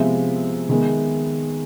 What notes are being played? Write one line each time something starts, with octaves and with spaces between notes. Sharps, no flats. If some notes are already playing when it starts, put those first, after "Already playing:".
Already playing: C3 F3 G#3 B3 E5
D#3 G#3 B3